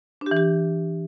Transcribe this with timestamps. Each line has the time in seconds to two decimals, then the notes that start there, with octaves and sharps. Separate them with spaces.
0.21 D4
0.26 G4
0.31 E3
0.36 G4